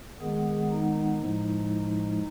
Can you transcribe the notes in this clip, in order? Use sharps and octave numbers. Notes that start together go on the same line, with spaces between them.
D#3 G#3 B3 G#4
D#4
A2 F3 G#3